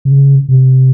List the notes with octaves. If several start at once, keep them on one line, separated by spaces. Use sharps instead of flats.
C#3
C3